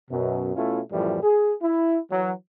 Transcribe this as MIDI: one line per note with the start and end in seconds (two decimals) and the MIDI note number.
0.11 0.53 42
0.11 0.53 47
0.55 0.80 47
0.55 0.80 57
0.55 0.80 61
0.55 0.80 64
0.55 0.80 65
0.92 1.20 42
0.92 1.20 45
0.92 1.20 52
0.92 1.20 53
0.92 1.20 55
1.22 1.53 68
1.62 1.98 64
2.12 2.32 52
2.12 2.32 54